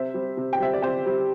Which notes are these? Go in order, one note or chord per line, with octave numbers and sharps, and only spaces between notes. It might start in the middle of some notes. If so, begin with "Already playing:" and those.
Already playing: C3 C5 E5
G3 C4
C3
G5
G3 C4 E5
D5
C3 G4 C5
G3 C4